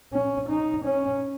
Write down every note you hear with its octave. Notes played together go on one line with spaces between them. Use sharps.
C#4
D#4
C#4